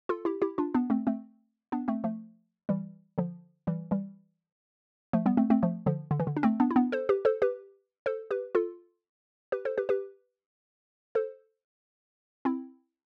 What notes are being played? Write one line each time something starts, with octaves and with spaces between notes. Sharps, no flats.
F4 A4
E4 G4
E4 G4
D4 F4
B3 D4
A3 C4
A3 C4
B3 D4
A3 C4
F3 A3
E3 G3
D3 F3
E3 G3
E3 G3
F3 A3
G3 B3
A3 C4
A3 C4
F3 A3
D3 F3
D3
E3
D3
D4
A3 C4
B3 D4
E4
B3 D4
A4 C5
G4 B4
A4 C5
G4 B4
A4 C5
G4 B4
F4 A4
G4 B4
A4 C5
G4 B4
G4 B4
A4 C5
C4 E4